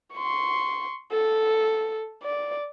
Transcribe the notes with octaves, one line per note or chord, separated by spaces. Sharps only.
C6 C#6
A4
D5